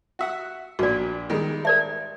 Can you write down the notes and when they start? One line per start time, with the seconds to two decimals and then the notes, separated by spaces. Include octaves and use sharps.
0.19 F#4 E5 F#5
0.79 A#1 A#2 F#4 D5
1.30 D#3 G3 G#3
1.65 A#4 D5 E5